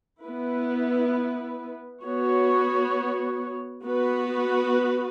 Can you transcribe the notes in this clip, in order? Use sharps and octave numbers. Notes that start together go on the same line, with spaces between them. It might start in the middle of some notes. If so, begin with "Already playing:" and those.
B3 E4 B4
B3 F#4 C#5
B3 F#4 B4